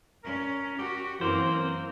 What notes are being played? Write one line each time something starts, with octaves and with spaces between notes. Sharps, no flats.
C#4 A#4
F#4 G4
F#2 E3 A#3 C4 C5